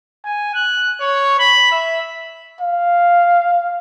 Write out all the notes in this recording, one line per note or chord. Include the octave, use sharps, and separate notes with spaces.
G#5
F#6
C#5
B5
E5
F5